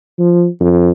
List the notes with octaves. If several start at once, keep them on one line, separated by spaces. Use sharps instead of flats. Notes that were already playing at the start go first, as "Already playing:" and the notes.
F3
F2